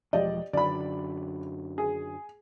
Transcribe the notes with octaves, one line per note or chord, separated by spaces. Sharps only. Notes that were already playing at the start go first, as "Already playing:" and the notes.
E1 F3 G#3 G4 D5 D#5
F#2 D3 F#3 D5 B5
G#4